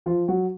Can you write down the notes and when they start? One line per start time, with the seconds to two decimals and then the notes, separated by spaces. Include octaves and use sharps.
0.06 F3 F4
0.28 F#3 F#4